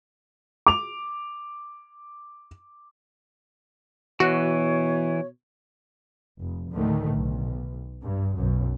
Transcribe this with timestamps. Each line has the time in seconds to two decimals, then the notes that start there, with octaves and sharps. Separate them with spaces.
0.66 D6 F7
4.20 B2 E3 F#4 C#5
6.40 F1
6.71 D2 A2 D3 D#3 A3
7.13 B1
8.02 G2
8.38 B1 F#2